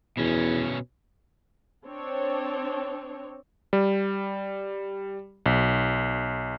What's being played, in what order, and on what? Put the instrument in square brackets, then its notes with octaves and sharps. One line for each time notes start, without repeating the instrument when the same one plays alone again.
[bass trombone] E2 [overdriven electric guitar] B2 C#4
[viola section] C4 D4 C#5
[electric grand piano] G3
B1